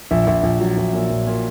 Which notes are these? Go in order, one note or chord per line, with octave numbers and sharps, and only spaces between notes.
A#1 E5
A#1 E5
A#1
F#3
A#1
A#2
A#1
A#2